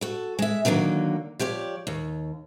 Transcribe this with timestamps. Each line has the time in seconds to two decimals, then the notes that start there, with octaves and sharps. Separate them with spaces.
0.01 F#4 A4
0.39 G#3 E5
0.65 D3 D#3 F#3 A#3 C4
1.39 F3 G4 C#5 D5
1.87 D#2